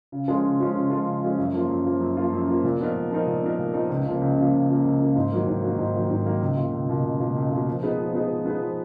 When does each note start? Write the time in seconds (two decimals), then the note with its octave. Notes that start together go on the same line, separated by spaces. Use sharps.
0.12 C#3
0.28 F3 G#3 C#4 F4
0.44 C#3
0.59 F3 G#3 C#4 F4
0.75 C#3
0.90 F3 G#3 C#4 F4
1.07 C#3
1.23 F3 G#3 C#4 F4
1.38 F#2
1.53 F3 A#3 F4
1.69 F#2
1.85 F3 A#3 F4
2.00 F#2
2.17 F3 A#3 F4
2.33 F#2
2.48 F3 A#3 F4
2.64 A#2
2.80 F3 B3 D#4 A#4
2.95 A#2
3.11 F3 B3 D#4 A#4
3.27 A#2
3.43 F3 B3 D#4 A#4
3.58 A#2
3.74 F3 B3 D#4 A#4
3.90 C#2
4.06 C#3 F3 A#3
4.22 C#2
4.37 C#3 F3 A#3
4.53 C#2
4.69 C#3 F3 A#3
4.84 C#2
5.00 C#3 F3 A#3
5.16 G#2
5.31 D#3 F#3 A#3
5.47 G#2
5.62 D#3 F#3 A#3
5.79 G#2
5.95 D#3 F#3 A#3
6.10 G#2
6.25 D#3 F#3 A#3
6.41 C#2
6.57 B2 A#3 F4
6.72 C#2
6.89 B2 A#3 F4
7.05 C#2
7.20 B2 A#3 F4
7.36 C#2
7.52 B2 A#3 F4
7.67 F3
7.83 B3 D#4 G#4 B4
7.99 F3
8.14 B3 D#4 G#4 B4
8.30 F3
8.45 B3 D#4 G#4 B4
8.62 F3